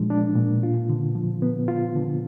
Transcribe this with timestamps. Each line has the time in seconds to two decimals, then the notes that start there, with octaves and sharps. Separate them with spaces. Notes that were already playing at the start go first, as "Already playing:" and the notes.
Already playing: A#2 F3 G#3 D4
0.10 D4
0.36 A#2
0.63 F4
0.89 D3
1.15 F3
1.42 B3
1.68 F4
1.95 D3